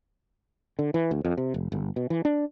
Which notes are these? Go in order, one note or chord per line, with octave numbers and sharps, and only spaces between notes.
D3
E3
D2
F2
C3
F1
G1
B2
E3
D4